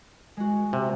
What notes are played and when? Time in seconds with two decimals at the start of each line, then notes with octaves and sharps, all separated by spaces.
0.37 G#3 F#4
0.73 C3